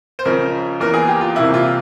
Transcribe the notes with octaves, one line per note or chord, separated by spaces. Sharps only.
C5
C#2 C#3 F3 A#4
E2 E3 A#3 A#4
G#4
G4
F4
C2 C3 E3 A#3 E4
F4